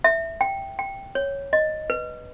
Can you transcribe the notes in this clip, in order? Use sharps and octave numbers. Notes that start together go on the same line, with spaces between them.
E5
G5
G5
C#5
D#5
B4